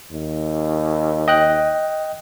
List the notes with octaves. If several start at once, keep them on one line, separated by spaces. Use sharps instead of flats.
D#2
D#5 G5 F#6